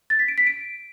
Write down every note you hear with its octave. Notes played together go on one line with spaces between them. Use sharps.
A6
B6
D7
B6
D7